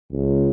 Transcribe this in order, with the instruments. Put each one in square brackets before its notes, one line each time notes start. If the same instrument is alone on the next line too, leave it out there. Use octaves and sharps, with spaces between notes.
[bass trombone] C#2